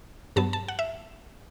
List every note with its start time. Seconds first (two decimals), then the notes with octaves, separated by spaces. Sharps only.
0.36 G2 F#3 B3 A5
0.53 A5
0.68 F#5
0.79 E5